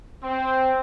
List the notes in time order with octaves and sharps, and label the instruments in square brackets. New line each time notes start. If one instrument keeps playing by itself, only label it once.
[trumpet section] C4